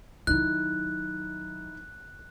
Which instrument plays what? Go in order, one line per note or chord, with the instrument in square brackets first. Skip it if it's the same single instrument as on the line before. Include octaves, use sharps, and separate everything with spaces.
[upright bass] D#3 F#3 [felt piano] D#4 E4 [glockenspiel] F#6